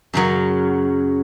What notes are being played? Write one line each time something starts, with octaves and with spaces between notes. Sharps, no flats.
F#2 C#3 F#3